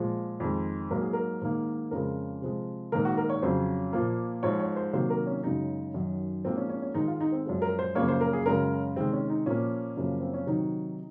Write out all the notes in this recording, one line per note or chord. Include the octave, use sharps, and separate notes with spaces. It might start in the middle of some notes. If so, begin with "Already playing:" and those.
Already playing: A#2 F3 G#3
F2 D#3 G#3
G#2 F#3 A#3 A#4
G#4
A#4
G#2 D#3 A#3
F2 C#3 F3 G#3 A#4
C3 F3 G#3
G#2 D#3 A#3 A#4
F#4
A#4
C#5
F2 C#3 F#3 C5
A#2 F3 A#3
G#2 F3 G#3 C#5
C#5
C5
C3 D#3 F#3 A#3 C5
A#4
C#4
F#2 C#3 G#3 D#4
F#2 D#3 F#3
G#2 F3 A#3 C4
C#4
C#4
C#4
G#2 D#3 G#3 D#4
F4
D#4
C4
F#2 F3 G#3
A#4
C5
F#2 C#3 F3 A#3 C#5
C5
A#4
G#4
F#2 C#3 G#3 A#4
C3 D#3 G#3 C4
C#4
D#4
A#2 F3 A#3 C#4
F#2 C#3 F3 A#3
C4
C#4
C3 D#3 F#3 D#4